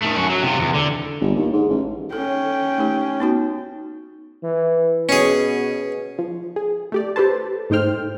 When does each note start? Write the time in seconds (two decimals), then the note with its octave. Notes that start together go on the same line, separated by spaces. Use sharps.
0.02 D#3 A3
0.16 F#2 F#4
0.29 F#3
0.43 C3 F4
0.59 E2
0.74 D3
1.21 G1
1.35 D#2
1.53 G#2
1.69 A1
2.12 C#4 A4 G5
2.78 A3 D#4 G4
3.20 B3 D#4 F#4
4.43 E3
5.09 B2 C#4 G#4
6.19 F3
6.56 G#4
6.92 A3 G4 D5
7.16 G4 A4 B4 C5 A5
7.70 G#2 A3 D#4 C5 G5 F6